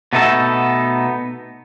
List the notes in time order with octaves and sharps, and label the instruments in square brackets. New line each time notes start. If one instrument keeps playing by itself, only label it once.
[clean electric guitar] B2 A3 B3 D#4 A4